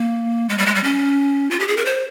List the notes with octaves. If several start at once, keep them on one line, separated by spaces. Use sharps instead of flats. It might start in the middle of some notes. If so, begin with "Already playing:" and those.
Already playing: A#3
G#3
G3
G#3
G3
C#4
F4
G4
G#4
A#4
C5